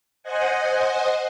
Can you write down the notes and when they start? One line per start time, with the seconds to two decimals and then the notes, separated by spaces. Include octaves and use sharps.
0.23 C5 D#5 F#5 G#5